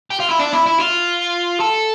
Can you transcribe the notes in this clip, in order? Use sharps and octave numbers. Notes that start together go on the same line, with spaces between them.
G4
F4
E4
D4
E4
E4
F4
A4